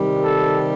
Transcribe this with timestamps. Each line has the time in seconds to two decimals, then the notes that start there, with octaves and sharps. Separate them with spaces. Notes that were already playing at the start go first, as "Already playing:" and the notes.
Already playing: C3 D#3 G3
0.23 A4